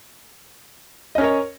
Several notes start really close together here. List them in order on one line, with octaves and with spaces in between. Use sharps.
D#5 C#4 A#4 C#5